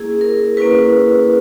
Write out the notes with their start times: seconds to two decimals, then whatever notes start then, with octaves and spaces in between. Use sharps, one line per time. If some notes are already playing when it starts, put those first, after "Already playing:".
Already playing: A#3 C#4 E4 G#4
0.21 A#4
0.57 A#3 C#4 E4 B4